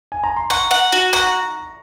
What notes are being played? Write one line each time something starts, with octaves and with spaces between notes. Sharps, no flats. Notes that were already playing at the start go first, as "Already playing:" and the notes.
G#5
A#5
C6
F#5 A#5 C#6
F#5
F#4
F#5 A#5 C#6